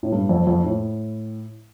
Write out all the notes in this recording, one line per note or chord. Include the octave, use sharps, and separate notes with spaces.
A2
G2
F2
F2
A2